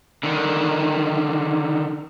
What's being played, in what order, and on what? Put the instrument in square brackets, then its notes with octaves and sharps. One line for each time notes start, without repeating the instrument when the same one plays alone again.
[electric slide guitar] D3 D#3